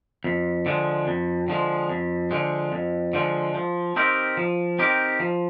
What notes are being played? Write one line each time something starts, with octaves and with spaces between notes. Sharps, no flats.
F2
D3 F3 G#3
F2
D3 F3 G#3
F2
D3 F3 G#3
F2
D3 F3 G#3
F3
C4 D#4 G4 A#4
F3
C4 D#4 G4 A#4
F3